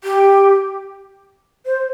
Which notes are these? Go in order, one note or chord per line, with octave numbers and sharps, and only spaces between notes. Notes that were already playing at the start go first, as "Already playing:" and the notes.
G4
C5